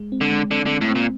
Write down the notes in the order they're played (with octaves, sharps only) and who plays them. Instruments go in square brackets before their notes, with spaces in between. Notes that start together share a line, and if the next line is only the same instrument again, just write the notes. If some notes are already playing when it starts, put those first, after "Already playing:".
Already playing: [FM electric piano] G#3
C4
[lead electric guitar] D3
[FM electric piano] G#3
[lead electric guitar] D3 [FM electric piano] C4
[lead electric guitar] D3 [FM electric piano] G#3
[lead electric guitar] A2
[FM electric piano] C4
[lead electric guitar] A#2